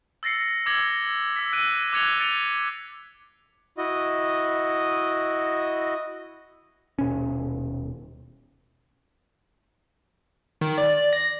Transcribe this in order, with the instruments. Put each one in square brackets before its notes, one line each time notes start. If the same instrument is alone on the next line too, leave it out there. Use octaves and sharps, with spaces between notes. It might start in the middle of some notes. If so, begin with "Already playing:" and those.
[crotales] E6 A6 A#6 C7 C#7
D6 E6 G#6 A#6 F#7 G7
E6 B6
E6 F#6 D7 D#7
D6 F#6 G#6 C#7 F7 G7
A6 C#7 D7 F7
[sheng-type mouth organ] E4 F#4 D#5
[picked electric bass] D#1 B2 C#4
[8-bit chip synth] D#3
D5
A#6